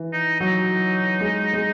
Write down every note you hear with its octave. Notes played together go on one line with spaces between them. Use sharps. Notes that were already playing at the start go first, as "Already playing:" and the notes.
Already playing: E3
D#4
F#3 D#4
G#3
G#3